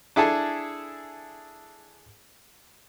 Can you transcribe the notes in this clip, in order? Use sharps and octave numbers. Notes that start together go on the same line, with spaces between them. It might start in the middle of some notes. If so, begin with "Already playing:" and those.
D4 E4 G#4 A4 G#5 A5